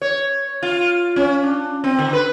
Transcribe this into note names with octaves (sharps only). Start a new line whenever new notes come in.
C#5
F4
C#4
D4
C4
D3
B4